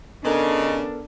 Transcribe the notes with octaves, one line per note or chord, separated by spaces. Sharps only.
C#3 B3 D4 D#4 A4 A#4